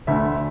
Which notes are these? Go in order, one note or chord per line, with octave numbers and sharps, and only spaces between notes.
D2 D3 A3 E5